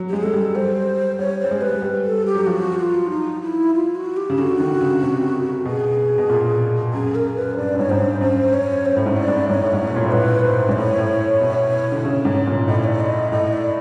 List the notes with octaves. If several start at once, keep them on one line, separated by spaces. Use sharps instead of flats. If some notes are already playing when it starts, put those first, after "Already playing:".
Already playing: F#3
G4
G#3 G#4
G#3 A4
G3
G3 C5
G3 C#5
G3 C5
G#3
B4
G#3
G3
A4
G4
F#3
F3 F#4
F4
D#4
E4
F4
F#4
G4
C#3
D3 F#4
D#3
C#3
C3
B2 G#4
B2
A#2
F#2 G#4
A#4
B4
G2 D5
G2
G#2 C#5
G#2 C5
G2
F#2 C5
C#5
F#2 C5
A2
G#2
D5
G#2
G#2 C#5
A2
G#2
B2
A#2
A2
C5
G#2 B4
C5
G#2
D5
A2 C#5
A2
B2
D3
C#3
G#2
A#2
A2 D#5
D5
C#5
D5
D#5
A2 D#5
D5